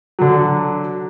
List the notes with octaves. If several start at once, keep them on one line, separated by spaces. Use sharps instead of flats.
D3 F#3